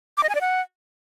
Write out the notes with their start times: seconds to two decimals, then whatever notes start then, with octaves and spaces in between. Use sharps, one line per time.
0.17 D6
0.23 D#5
0.29 G#5
0.35 D5
0.41 F#5